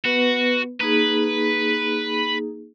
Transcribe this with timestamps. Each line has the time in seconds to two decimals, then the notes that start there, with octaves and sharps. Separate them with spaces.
0.05 B3 F#4 B4
0.81 A#3 D#4 G#4 B4